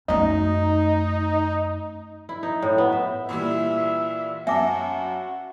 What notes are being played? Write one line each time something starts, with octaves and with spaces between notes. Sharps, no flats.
F#2 A3 D#4
E4
D#4
A2
B3
E5
A#2 E3 G3 E5
F#2 F#4 E5 G#5 A5 D6